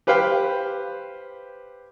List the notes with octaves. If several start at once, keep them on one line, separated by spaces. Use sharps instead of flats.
G4 B4 C5 F5 G5